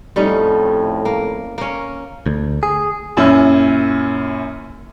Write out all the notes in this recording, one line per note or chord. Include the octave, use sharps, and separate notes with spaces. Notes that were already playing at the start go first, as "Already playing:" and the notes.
F2 A2 G3 C#4 D#4
A#3
A#3 C#4
D2
G#4
F#2 A#2 C#4 E4